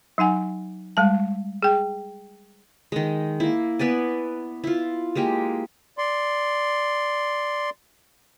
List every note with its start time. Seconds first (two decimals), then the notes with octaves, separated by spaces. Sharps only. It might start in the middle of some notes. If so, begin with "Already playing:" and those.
0.18 F#3 D#4 F#5 G#5
0.97 G3 G#3 A5
1.63 G#4 G5
2.92 D#3 G#3
3.40 A#3 E4
3.79 B3 B4 D5 G#5
4.64 E4 F4
5.15 G#3 A#3 G4 G#5
5.98 D5 C6